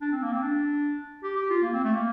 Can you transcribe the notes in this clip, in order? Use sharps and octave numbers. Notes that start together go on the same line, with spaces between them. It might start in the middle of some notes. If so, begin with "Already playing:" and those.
D4
C4
A#3
C4
D4
G4
G4
F4
A#3
C4
A3
A#3